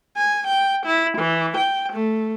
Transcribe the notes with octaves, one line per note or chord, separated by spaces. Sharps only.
G#5
G5
E4
E3
G5
A3